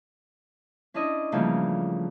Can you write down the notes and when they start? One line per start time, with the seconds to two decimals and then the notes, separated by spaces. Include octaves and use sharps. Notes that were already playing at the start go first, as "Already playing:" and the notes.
0.94 C#4 D4 E4 D#5
1.32 C#3 E3 F3 G3 A3 A#3